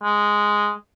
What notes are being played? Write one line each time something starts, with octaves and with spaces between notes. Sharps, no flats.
G#3